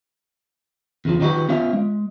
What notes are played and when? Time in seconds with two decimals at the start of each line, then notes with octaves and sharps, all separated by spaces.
1.05 E2 C#3 F3
1.20 D#3 F3 D#4 F#4 G4 B4
1.49 B3 C#4 F4 C5 E5 F5
1.73 G#3